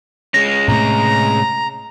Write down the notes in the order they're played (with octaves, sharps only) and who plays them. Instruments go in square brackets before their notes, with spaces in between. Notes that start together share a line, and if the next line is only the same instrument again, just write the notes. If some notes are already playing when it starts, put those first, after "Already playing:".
[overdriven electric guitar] G#3 C#4 [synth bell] A#6
[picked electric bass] A2 C3 A3 [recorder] A#5